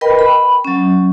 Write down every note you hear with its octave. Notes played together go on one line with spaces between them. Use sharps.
A#4 B4 D#5 G5 B5
B5
F#3 C#4